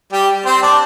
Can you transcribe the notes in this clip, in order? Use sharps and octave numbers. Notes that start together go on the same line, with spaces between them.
G3 G4
C4 C5
D4 D5